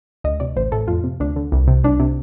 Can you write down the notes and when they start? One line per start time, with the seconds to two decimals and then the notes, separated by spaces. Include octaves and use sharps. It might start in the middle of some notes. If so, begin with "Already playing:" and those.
0.24 D2 D#5
0.40 C3 D5
0.56 A1 C5
0.72 A2 A4
0.88 F2 F4
1.04 C3
1.20 D2 D4
1.36 D3
1.52 C2
1.68 C3
1.84 C2 D4
2.00 C3